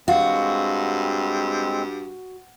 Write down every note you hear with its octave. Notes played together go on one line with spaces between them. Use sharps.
G2 G#3 C4 F#4 F5